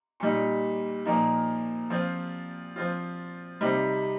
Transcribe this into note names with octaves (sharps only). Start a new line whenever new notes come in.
A#2 G3 D#4
A#2 F3 A#3 D#4
F3 C4 F4
F3 C4 F4
C3 G3 C4 D#4